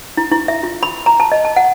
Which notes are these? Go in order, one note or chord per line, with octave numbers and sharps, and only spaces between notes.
E4
E4
E5
F4
B5
A#5
A5
D#5
A5
F#5